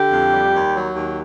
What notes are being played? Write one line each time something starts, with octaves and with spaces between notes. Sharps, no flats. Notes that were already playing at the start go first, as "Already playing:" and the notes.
Already playing: D3 G4
F2
G3
D#2
F#3
D#2